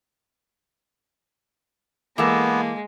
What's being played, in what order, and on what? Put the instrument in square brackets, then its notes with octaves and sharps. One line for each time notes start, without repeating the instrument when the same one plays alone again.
[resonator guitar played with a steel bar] E3 A4 A#4 [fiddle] G#3 [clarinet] A#3 [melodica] B3